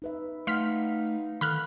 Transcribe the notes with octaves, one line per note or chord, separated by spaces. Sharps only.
D#4 B4 E5
A3 D#4 F5 F#5 C6 F6 B6
D3 D#3 B5 F6 F#6